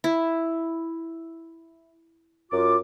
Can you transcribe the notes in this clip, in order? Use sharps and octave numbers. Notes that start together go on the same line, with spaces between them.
E4
F#2 F4 D6